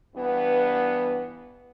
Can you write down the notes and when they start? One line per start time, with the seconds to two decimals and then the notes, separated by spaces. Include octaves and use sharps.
0.16 G2 E3 B3